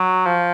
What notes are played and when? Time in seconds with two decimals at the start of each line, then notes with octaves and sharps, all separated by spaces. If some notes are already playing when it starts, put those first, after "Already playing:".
Already playing: F#3
0.26 F3